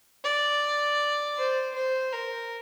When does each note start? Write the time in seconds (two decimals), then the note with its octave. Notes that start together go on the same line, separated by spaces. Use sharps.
0.24 D5
1.38 C5
1.76 C5
2.13 A#4